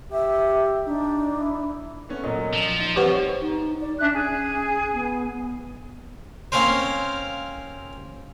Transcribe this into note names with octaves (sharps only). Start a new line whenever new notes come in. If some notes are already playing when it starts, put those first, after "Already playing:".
G4 E5
D4 D#4
E4
A3 B3 C#4
A#2 F#3 D#5
F3
D#4
G3 C4 G4 B4 C#5 F#5
D#4
D5
C#4 D4 E5 F#6
G#4
B3
A#3 C4 C#4 A#4 C5